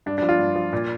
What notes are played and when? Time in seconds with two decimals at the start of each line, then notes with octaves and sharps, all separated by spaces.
0.06 G2 D4
0.18 D4
0.22 F3
0.29 F4
0.39 G2
0.55 F3
0.73 A#2